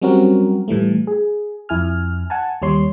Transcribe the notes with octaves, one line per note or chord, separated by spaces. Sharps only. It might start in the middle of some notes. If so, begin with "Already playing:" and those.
F#3 G3 C4 C#4 F#4 A#4
A2 E3 G3 A3
G#4
F2 E4 G#5 F6
F#5 G#5 A5
D#2 G3 C#5 C6